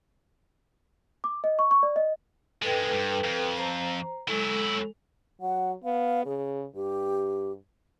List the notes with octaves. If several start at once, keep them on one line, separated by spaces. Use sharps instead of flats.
D6
D#5
C#6
C#6
D5
D#5
G2 G#3 A4 B4 G5
G2
F2
C5 A#5
F#3 G#3 E4 A4
F#3 F#5
B3 F5
C#3 G#4
G2 G4